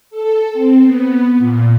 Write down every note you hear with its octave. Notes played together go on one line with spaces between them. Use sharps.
A4
C4
B3
A#2